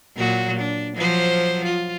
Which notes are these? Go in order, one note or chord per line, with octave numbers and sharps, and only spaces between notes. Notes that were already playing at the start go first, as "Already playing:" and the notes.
A#2 F#3 F#4
D4
F3 F#3 C5
F4